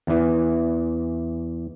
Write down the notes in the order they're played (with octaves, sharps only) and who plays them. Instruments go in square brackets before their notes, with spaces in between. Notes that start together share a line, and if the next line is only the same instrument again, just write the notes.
[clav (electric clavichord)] E2 E3